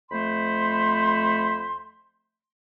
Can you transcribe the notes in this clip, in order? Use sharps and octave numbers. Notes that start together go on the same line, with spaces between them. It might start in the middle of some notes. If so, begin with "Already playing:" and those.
F2 A3 C5 B5 C6